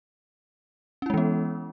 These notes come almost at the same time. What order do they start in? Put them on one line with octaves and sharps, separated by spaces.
C#4 E4 G#3 E3 B3